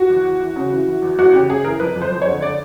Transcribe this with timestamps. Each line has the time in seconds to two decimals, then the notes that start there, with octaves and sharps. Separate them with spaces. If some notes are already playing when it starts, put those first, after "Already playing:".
Already playing: F#4
0.09 E2
0.25 E2
0.40 E3
0.56 C#3
0.71 E3
0.88 E3
1.02 E2
1.19 E2 F#4
1.33 C#3 G4
1.49 C#3 G#4
1.64 E3 A#4
1.80 F2 B4
1.96 F2
2.01 C5
2.12 F2
2.22 D3 C#5
2.42 D3 D5